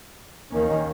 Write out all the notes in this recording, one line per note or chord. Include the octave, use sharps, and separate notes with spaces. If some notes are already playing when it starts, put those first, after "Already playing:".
D#2 D#3 A#3 C#4